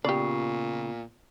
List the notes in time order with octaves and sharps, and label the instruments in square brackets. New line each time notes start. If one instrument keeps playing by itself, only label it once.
[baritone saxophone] A#2 [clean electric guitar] C#3 [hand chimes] B3 F4 C7 [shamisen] G4 D5